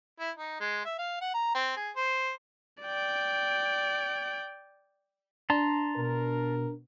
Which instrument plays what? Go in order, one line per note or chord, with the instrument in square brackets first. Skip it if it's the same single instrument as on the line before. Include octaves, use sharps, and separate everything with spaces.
[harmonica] E4
D#4
G#3
E5
F5
F#5
A#5
C4
G#4
C5
[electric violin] D5 G5
[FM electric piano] D4 [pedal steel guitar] A5 A#5 C6
[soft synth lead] B2 [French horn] A#4